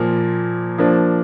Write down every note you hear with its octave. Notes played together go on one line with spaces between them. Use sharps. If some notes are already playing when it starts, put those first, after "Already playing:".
Already playing: A#2 F3 A#3
F3 A#3 D4